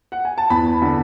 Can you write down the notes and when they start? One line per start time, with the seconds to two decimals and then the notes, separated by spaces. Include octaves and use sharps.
0.12 F#5
0.25 G#5
0.38 A5
0.50 E2 B5
0.82 D3